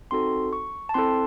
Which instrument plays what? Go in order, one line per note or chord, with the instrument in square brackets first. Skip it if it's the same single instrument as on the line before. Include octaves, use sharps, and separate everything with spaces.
[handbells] C4 D#4 F#4 A4 C6
C#6
A5
C4 E4 A4 C6